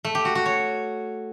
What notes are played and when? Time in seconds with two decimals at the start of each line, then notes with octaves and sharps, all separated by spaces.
0.05 A3
0.15 G4
0.25 F#4
0.35 F#4
0.46 C#5